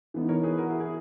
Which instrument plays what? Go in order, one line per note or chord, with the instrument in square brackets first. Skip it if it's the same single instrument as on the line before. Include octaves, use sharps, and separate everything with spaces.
[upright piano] E3 B3 D#4
[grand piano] A#4 C#5
G#4 B4
F#4 A#4
E4 G#4
E4 G#4